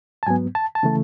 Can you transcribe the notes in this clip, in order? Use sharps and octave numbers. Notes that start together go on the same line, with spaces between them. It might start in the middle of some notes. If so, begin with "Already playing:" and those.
A5
G#2 F#3 B3 G#5
A5
A5
C#3 E3 A3